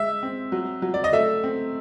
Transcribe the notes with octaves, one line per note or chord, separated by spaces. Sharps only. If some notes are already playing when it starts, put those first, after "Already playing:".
Already playing: G#3 E5
C4
F#3
F#3
D5
D#5
A3 E5
C4